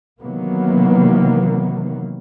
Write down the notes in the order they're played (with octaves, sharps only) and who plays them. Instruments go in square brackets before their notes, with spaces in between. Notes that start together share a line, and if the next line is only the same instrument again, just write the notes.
[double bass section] C3 D#3 E3 F#3 A#3 B3